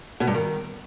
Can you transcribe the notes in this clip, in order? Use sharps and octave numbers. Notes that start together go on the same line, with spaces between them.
B2
G2
D#3